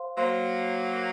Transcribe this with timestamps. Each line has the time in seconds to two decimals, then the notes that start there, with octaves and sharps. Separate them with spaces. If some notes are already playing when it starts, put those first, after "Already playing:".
Already playing: C5 F5 C6
0.17 F#3 A#3 C5 F5 C6